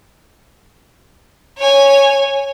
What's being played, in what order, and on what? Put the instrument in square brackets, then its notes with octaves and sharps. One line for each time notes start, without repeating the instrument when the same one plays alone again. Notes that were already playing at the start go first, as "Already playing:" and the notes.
[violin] C#5 G#5